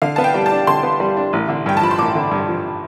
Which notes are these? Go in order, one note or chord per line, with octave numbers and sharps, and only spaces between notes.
D3 F5
B3 A5
G5
G3
A5
D4
D3 C6
B3
G3
D4
A1
D3
G2 G5
A5
F3 B5
C6
A1 D6
D3
G2
F3